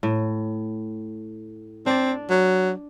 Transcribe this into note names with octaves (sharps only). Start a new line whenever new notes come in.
A2
C4 D4 D5
F#3